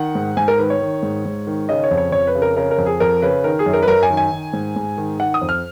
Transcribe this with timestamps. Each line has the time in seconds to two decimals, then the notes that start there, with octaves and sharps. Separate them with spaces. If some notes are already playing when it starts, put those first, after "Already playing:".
Already playing: D#3 F#5
0.15 G#2
0.37 G#2 G#5
0.48 A#4
0.59 D#3 B4
0.70 C#5
0.81 D#3
1.03 G#2
1.25 G#2
1.47 D#3
1.69 C#3 D#5
1.84 C#5
1.91 F2
1.98 C#5
2.12 F2 C#5
2.27 B4
2.35 C#3
2.42 A#4
2.57 C#3 A#4
2.71 A#4
2.78 F2
2.86 G#4
3.00 F2 A#4
3.22 C#3 B4
3.44 D#3 A#4
3.59 G#4
3.66 F#2
3.73 A#4
3.83 B4
3.87 F#2 A#4
4.03 G#5
4.10 D#3
4.17 G#5
4.32 D#3
4.53 G#2
4.76 G#2
4.97 D#3
5.19 D#3 F#5
5.34 D#6
5.41 F2
5.49 F6